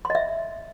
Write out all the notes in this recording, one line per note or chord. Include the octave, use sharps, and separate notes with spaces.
C6
D#5
E5